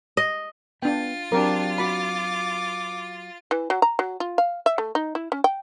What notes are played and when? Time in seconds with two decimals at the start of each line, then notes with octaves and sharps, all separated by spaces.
0.17 D#5
0.82 B3 D4 F4 G5 A6
1.32 F#3 C4 D4 G4 A#4
1.78 F#4 B5 D6
3.51 E3
3.70 F#3
3.82 A#5
3.99 F#3
4.20 F4
4.38 F5
4.66 E5
4.78 A3
4.95 D#4
5.15 E4
5.32 C#4
5.44 G5